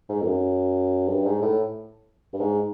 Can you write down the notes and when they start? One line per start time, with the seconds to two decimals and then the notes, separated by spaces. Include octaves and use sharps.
0.09 G#2
0.21 F2
0.25 F#2
1.08 G2
1.25 G#2
1.42 A2
2.33 G2
2.40 G#2